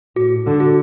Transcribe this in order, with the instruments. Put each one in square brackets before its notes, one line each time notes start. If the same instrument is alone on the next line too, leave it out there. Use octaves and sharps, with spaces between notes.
[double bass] A2 [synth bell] F#4
[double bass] D3
[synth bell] F#4